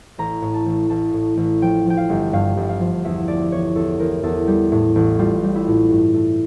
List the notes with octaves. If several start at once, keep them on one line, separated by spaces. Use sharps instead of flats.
A1 A#5
A2
A5
A1
A1 A5
A2
A1
F3 G5
F3 G5
F5
G1
G2 F5
G1
F5
F3
E2 E5
A3 D5
E2 C#5
E2 A4
E2 A#4
E2 A4
G3
A2
A1
G3 F4
G3
E4
A2
G2
A3